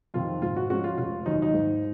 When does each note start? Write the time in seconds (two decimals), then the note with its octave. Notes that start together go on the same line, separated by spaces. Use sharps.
0.14 F2 C3 D#3 F4
0.42 G#2 F4
0.56 F#4
0.70 F3 G#3 C#4 F#4
0.84 F4
0.98 F1 F4
1.26 D#2 D#3 F#3 D#4
1.42 D#4
1.54 G#2